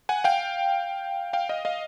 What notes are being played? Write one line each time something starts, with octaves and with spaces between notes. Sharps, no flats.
F#5 G#5
F5 G5
F5 G5
D#5 F5
D#5 F5